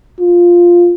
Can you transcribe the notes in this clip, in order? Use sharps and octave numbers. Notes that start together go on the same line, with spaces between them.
F4